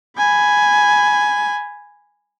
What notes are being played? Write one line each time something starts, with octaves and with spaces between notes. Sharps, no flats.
G#5 B5